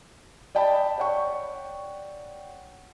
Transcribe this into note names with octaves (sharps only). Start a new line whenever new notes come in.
D5 D#5 G5 A5 B5
C#5 D5 F#5 G5 C#6